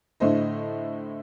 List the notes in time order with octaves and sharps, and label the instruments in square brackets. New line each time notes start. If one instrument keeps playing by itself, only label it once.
[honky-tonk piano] A2 D3 A3 C5 D#5